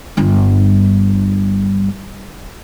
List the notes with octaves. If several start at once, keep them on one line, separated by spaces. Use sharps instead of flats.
G1 G2